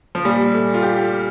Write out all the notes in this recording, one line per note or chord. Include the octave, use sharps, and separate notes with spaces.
F3
A#2 G3
A3
F4
G4